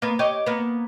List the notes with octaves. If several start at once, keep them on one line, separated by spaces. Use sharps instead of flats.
A#3 B3
G4 C#5 D#5
A#3 B3